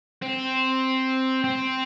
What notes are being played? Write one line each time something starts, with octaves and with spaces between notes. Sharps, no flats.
C4
C4